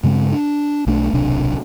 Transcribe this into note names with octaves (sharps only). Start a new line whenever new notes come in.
G2 C#3 G#3 C4
D4
B1 A3 D4
D1 B1 C3 D4